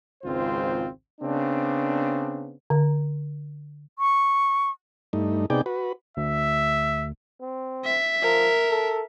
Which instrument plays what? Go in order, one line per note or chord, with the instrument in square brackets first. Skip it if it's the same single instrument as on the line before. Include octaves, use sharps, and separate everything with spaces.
[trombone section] G#1 C#2 C4 F4 C5
C#3 B3 C4 D4
[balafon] D3
[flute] C#6
[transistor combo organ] G2 A3 D#4
C3 B3 D#4 G#4 D5 G5
F#4 B4
[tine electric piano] D2 [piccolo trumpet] E5
[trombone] C4
[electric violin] E5
[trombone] F3 [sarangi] A#4
[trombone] A4